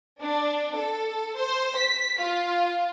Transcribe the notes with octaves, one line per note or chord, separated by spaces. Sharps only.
D4
A4
C5
B6
F4